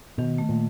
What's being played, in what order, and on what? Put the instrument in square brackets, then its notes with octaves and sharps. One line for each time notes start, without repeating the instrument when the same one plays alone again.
[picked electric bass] B2 [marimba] D#3
[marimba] A3
[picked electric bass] A#2